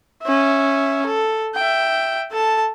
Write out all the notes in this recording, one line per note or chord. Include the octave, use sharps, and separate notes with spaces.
C#4 E5
A4
E5 G5
A4 A5